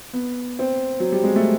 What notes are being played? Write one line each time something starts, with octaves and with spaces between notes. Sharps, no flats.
B3
C4
F#3
G3
G#3
A3